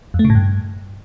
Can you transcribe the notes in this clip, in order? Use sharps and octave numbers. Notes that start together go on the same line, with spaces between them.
F2
A3
C#3
A2
G2